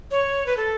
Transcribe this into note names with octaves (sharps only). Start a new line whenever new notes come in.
C#5
B4
A4